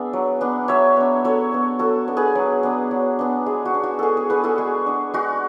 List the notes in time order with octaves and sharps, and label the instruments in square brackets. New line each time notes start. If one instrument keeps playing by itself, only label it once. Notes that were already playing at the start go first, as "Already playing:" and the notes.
Already playing: [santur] B3 D4 G#4 D5 E5
F#3
B3 D4
F#3 C#5 E5
B3 D4
F#3 A4 C#5
B3 D4
F#3 F#4 A4
B3 D4
G#4 B4
F#3
B3 D4
F#3
B3 D4
G#3 G#4
F#4
D4
F#4
G#3 G#4 A4
G#4
D4 G#4 B4
F#4 A4
G#3 G#4
D4
G#3 F#4